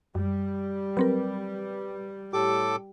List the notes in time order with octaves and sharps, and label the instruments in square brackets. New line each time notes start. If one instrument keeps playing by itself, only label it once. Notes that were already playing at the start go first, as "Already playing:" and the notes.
[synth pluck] F#2 [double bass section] G3
[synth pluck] F#3 C4 A#4 [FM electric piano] B4
[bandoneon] A2 A4 D6 [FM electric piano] G4